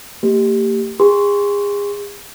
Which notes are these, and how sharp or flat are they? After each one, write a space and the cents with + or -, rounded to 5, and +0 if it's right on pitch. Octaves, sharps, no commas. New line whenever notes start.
A#3 -45 G4 +0
G#4 -35 C6 +0